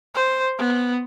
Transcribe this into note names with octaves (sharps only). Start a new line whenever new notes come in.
C5
B3